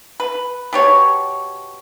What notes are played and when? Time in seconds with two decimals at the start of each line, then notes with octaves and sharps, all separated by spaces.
0.20 B4
0.73 B2 G4 C#5